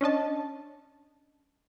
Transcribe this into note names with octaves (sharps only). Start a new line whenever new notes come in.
C#4 D4 D#5 A5